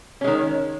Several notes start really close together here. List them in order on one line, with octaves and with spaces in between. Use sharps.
C#4 G#3 D#3